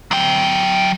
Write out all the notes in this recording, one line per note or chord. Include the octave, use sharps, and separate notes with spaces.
F#3 G5